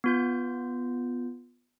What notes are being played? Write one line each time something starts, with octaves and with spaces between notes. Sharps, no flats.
B3 F4 G6